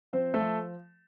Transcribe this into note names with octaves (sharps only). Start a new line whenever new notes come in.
F3 C4 C5
A3 A4
F3